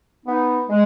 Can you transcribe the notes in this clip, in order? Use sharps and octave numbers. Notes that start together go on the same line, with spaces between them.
B3 D#4
G#3